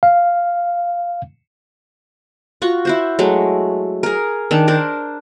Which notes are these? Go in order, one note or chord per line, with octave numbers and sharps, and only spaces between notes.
F5
F4 F#4 C#6
E4 F#4 C5
F#3 G#3 A3
G#4 A#4
D#3 D4
D4 A#4 C5